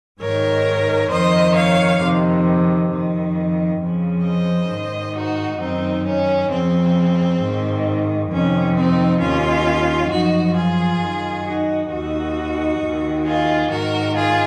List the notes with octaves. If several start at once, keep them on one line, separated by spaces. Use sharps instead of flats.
G#2 D#3 A#4 C#5
F2 D#3 C5 D#5
C#5 F5
F2 C3 D#3
F2 D#3
F2 C#3 F3
C5 D#5
G#2 D#3
D#4 F#4
F#2 D#3 C4 D#4
C#4
F2 C#3 F3 C4
G#2 D#3
F2 C3 D#3 C#4
C4 D#4
D#2 D#3 C#4 F4
F#2 F3 D#4 F#4
F4 G#4
F#2 D#3
D#4 F#4
D#2 D#3 D#4 F#4
D#2 D#3
F4 G#4
G#2 D#3 F#4 A#4
F4 G#4